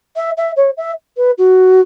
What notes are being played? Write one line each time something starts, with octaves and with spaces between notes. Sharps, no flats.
E5
E5
C#5
E5
B4
F#4